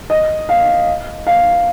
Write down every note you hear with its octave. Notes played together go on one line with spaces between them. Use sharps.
D#5
F5
F5